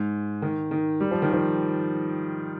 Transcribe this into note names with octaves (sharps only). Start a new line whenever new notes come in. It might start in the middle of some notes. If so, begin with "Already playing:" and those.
Already playing: G#2
D#3
D#3
G3
F3
D#3
F3